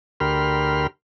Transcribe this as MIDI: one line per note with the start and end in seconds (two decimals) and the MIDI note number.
0.20 0.87 38
0.20 0.87 67
0.20 0.87 70
0.20 0.87 83
0.20 0.87 84
0.20 0.87 89